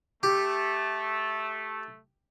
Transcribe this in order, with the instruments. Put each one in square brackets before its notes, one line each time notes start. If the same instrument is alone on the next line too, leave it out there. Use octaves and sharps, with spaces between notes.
[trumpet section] A3 [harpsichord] G4